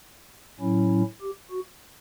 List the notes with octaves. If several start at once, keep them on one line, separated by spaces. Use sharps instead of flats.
A2 F#3 C#4 E4
G4
F#4